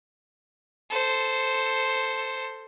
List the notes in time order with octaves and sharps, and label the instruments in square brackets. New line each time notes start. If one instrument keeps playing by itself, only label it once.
[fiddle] A4 C5